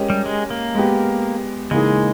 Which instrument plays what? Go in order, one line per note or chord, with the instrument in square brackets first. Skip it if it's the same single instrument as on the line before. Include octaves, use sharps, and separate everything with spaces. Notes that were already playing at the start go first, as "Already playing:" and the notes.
Already playing: [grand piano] G#3 C#4 G4 A#4 D#5
[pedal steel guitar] G3
G#3
A#3
[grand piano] G#3 B3 G4
[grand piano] C#3 E3 A#3 D#4 G#4 [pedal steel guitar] G#3